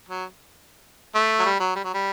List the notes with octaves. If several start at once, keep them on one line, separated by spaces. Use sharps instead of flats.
F#3
A3
F#3
G3
F#3
G3
F#3
G3